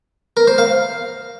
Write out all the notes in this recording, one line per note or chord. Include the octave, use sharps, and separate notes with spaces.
A#4
C5
F5